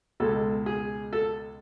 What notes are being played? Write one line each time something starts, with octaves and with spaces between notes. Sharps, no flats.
C#2 B2 G#3 A4
G#4
A4